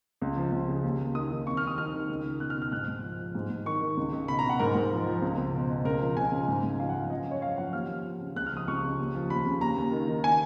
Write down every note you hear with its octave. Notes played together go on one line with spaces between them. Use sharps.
C#2
F3
C#2
C#3
D#2
D#2
D#3 D#6
D#3
F2 C#6
F2 F6
D#6
D#3 F6
D#3
C#2
C#2
B2 F#6
F6
B2
F6
G#2 F#6
G#2
F3
F3
G#2
G#2
D#3 C#6
D#3
C#2
C#2
B2 B5
B2 A#5
F#5
G#2 A#4
G#2
F3
F3
C#2
C#2
B2
B2
C#2 A#4
F3
C#2 G#5
C#3
G#2
G#2
F3 F5
F#5
F3
F5
F#2 D#5
F#2
C#5
F3 F5
F3 F#5
D#2 F6
F3
D#2
C#3
C#2 F#6
F6
F3 D#6
C#2 C#6
C#3
D#2
F3
D#2 B5
C#3
D#2 A#5
D#2
D#3
D#3
G#5